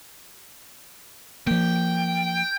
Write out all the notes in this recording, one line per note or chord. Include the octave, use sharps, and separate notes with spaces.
F3 A#3 G5